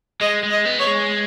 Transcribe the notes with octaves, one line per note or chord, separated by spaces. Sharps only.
G#3 D#5
G#3
D#5
B3
C#5
G#3